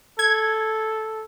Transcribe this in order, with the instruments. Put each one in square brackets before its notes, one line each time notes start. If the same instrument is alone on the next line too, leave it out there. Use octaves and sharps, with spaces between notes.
[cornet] A4 [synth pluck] G#6